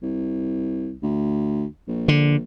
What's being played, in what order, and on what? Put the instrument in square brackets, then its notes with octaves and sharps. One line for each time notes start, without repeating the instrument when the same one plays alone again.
[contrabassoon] C2
D2
A#1
[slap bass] D3